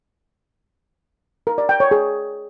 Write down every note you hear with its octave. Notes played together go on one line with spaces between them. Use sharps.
A#4
D5
G5
C#5
G#4